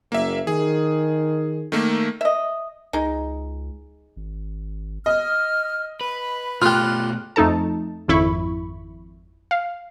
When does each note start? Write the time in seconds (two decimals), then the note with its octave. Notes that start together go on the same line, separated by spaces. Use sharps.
0.12 F#1 A#3 E5
0.47 D#3 G#4
1.72 D#3 A3 A#3
2.21 D#5 E5
2.93 C#2 G#3 D#4
4.16 G#1
5.06 D#5 F6
6.01 B4 B5
6.62 B2 A3 F4 G4 F6 F#6
7.36 F2 A3 D#4 A4 A5
8.08 G#1 F2 E4 B5 C#6
9.51 F5